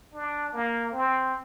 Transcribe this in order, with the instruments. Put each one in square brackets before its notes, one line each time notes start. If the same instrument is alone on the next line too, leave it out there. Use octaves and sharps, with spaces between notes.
[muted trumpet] D4
A#3
C4